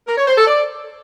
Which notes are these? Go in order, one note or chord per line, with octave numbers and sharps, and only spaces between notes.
A#4
C#5
C5
A4
D5